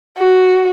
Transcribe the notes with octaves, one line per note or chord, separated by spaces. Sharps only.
F#4